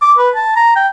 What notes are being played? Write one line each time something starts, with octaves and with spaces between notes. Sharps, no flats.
D6
B4
A5
A#5
G5